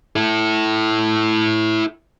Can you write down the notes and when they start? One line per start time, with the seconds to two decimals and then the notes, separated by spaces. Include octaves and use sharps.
0.16 E4 A4